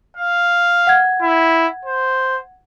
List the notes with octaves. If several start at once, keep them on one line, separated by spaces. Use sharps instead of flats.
F5
F#5 G#6
E4
C5